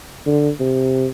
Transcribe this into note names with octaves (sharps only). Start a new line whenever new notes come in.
D3
C3